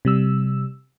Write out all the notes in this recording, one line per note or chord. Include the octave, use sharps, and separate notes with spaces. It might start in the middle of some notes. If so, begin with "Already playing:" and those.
C3 G3 E6